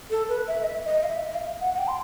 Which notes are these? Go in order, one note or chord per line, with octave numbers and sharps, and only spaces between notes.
A4
B4
E5
D#5
E5
D#5
F5
E5
E5
F5
F#5
F#5
G5
C6